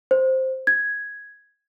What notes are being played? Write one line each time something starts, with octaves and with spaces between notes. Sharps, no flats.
C5
G#6